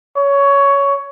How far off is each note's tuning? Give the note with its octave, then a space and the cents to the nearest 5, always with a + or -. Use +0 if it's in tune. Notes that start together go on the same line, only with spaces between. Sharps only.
C#5 +15